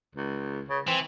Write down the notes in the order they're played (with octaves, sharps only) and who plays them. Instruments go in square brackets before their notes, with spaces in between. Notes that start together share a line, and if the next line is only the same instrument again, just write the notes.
[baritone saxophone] C#2
C#3
[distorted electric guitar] E3 [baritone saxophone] C4